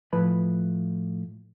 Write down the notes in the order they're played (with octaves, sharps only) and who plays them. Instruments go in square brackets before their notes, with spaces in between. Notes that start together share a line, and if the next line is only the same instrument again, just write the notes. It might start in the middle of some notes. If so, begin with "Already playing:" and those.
[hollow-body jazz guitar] A2 F3 B4 B5